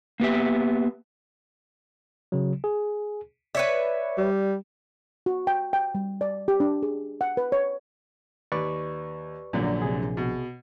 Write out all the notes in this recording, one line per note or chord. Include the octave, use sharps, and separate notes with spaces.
A#3 B3 G4 E5
C#3 F#3
G#4
B4 C#5 D5 E5
G3
F#4
G5
G5
G3
D5
G4
D4
G#4
F#5
B4
C#5
D#2 B4 D5 C#6
A#1 F#2 A#2 D3
C3 G#4
B2